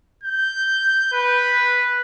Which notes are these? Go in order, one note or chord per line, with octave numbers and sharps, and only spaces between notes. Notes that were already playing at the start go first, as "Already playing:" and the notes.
G6
B4